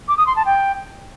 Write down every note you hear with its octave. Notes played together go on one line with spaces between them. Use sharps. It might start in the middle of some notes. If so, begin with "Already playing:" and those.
D6
D#6
C6
A5
G5